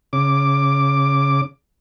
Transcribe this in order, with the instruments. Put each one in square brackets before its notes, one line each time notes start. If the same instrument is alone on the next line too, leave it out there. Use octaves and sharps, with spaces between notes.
[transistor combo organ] C#3 D6